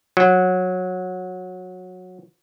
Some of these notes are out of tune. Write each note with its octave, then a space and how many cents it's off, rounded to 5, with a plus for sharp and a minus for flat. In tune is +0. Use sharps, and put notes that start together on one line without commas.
F#3 -15